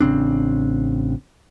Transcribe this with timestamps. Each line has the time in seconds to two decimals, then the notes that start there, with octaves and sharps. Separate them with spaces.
0.01 A1 C#3 C4 D4